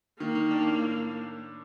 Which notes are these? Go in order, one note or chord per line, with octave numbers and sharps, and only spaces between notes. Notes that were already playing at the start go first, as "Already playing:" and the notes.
D#3 A#3
D#3
D4
A2
A2